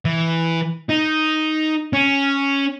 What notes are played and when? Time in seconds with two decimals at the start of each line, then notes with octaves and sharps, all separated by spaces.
0.05 E3
0.90 D#4
1.93 C#4